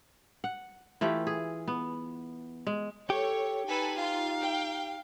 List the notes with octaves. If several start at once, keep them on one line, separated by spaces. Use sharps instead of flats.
F#5
E3 A3 F4 G4
G#4
B3
G#3
G4 A4 C#5
D#4 A4 B4 G#5
F4 F5
G5